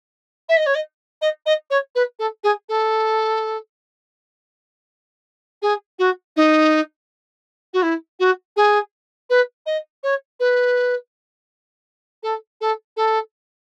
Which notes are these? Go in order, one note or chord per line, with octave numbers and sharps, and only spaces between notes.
E5
D#5
C#5
D#5
D#5
D#5
C#5
B4
A4
G#4
A4
G#4
F#4
D#4
F#4
E4
F#4
G#4
B4
D#5
C#5
B4
A4
A4
A4